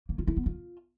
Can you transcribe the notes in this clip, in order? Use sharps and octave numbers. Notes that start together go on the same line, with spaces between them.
A#3
F4
E4
B3
F4